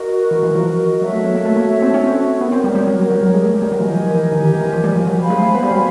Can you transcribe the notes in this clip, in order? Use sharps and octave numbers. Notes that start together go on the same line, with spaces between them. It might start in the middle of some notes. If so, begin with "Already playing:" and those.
Already playing: F#4 A#4 D#5
E3
E3
F3
F#3 F#4 A4 C#5 E5
A3
B3
A#3
A3
A#3
C4
C#4
C4
B3 G4 A#4 C#5
C4
G3
G3
F#3
F#3
F#3
G3
G#3
A3
G#3
G3
F#3
E3 G4 A#4 D#5 G#5
F3
F3
E3
D#3
E3
E3
F3
G3
F3
F#3
C5 F5 G#5 B5
G#3
A3
B3
G3
F#3